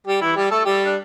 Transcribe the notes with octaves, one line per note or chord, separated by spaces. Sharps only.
G3 G4
E3 E4
G3 G4
A3 A4
G3 G4
D4